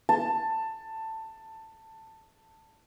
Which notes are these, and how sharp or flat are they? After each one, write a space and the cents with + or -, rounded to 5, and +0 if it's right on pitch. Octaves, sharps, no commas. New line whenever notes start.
A5 +15